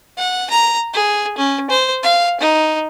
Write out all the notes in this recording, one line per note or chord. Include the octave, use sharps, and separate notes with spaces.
F#5
A#5
G#4
C#4
C5
F5
D#4